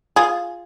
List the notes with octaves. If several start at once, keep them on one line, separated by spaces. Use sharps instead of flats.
F4 G#4